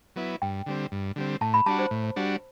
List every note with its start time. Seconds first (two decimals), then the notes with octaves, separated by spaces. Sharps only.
0.16 F#3 B3 E4
0.42 G2 G5
0.66 D3 G3 C4
0.92 G2
1.16 D3 G3 C4
1.41 A2 A5
1.54 B5
1.66 G3 D4 F#4 A5
1.79 C5
1.91 A2
2.16 G3 D4 F#4